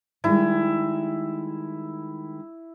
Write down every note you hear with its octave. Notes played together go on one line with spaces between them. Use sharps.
D#3 G3 G#3 E4